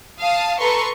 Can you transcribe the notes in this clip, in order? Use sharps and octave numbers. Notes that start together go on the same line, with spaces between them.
F5 A5 D#6
A4 B4 A#5 C6 C#6